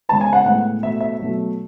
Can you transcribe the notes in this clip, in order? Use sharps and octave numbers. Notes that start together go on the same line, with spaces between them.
C#3 G#3 B3 A5
G#5
F#5
A2 G#3 B3 F#5
B2 A3 E5
E5
B2 F#3 A3